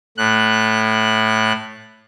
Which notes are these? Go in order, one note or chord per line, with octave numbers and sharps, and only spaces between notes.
A2 F#6